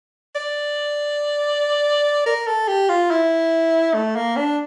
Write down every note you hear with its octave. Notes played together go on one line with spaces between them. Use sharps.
D5
A#4
A4
G4
F4
E4
A3
A#3
D4